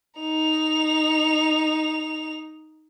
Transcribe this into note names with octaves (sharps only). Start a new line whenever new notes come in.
D#4 F7